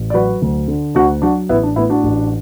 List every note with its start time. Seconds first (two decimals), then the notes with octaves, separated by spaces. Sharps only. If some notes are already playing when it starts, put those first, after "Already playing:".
Already playing: A1
0.10 D5
0.14 F#3 F#4 B4
0.42 D2
0.68 D3
0.95 D2 D4 F#4
1.22 F#3 D4 F#4
1.49 A1 B3 E4
1.63 D4
1.76 A2 B3 E4
1.90 D4 F#4
2.04 A1